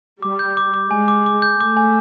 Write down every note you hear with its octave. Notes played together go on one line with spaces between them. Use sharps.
G3 D6
G6
D6
D6
G#3 G#5
D6
D6
G6
A3 D6
G#5